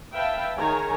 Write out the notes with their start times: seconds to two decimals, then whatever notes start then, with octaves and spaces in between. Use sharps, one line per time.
0.15 B4 E5 F5 G5 A5
0.58 D#3 G#4 C#5 G#5 A#5